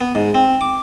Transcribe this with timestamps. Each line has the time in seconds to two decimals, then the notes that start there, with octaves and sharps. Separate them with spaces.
0.01 B3
0.15 G#2
0.34 C4
0.61 D6